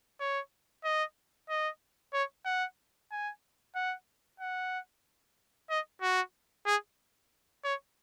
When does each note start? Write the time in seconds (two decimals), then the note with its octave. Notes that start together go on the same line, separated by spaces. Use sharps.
0.20 C#5
0.84 D#5
1.49 D#5
2.13 C#5
2.45 F#5
3.11 G#5
3.75 F#5
4.40 F#5
5.70 D#5
6.01 F#4
6.66 G#4
7.64 C#5